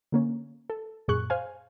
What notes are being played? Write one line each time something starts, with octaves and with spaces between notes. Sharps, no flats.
D3 A#3 C#4
A4
F#2 A#2 G#4 C#6 F#6
C5 F5 G#5